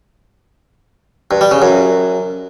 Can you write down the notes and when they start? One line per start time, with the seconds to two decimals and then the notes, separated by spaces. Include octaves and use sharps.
1.31 G2
1.41 G3
1.51 C#3
1.62 F#2